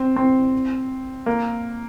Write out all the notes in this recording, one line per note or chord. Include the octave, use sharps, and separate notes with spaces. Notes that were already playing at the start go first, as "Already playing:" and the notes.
Already playing: C4
C4
A#3